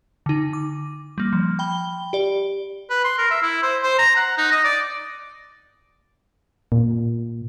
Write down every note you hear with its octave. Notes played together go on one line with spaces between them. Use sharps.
D3 D#4
D6
G3 A#3
F3
G5 B5 G7
G4 D5
B4
C6
A#4
E5
E4
C5
C5
A#5
F#5
D#4
D#5
D5
A#2